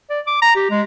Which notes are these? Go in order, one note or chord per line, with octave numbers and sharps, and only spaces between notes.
D5
D6
A#5
G4
G#3